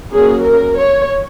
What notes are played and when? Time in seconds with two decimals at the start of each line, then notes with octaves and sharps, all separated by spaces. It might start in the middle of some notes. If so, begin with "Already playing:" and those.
0.13 F#3 A#3 C#4 G#4
0.44 A#4
0.77 C#5